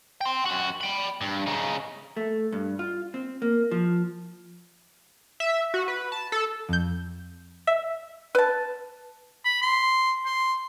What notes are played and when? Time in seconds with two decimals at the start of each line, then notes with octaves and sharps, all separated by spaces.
0.21 G5 C6
0.46 F#2 F#4
0.81 G5 B5
1.21 G2
1.47 C#3 D#4
2.17 A3
2.52 G2
2.79 F4
3.14 C4
3.42 A#3
3.71 F3
5.40 E5
5.74 F#4
5.88 B4
6.12 A5
6.32 A4
6.69 F2 G6
7.67 E5
8.35 B4 A5
9.45 B5
9.62 C6
10.26 C6